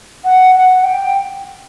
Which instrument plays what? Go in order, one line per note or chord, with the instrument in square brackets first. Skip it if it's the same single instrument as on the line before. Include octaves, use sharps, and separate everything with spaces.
[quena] F#5
F#5
G5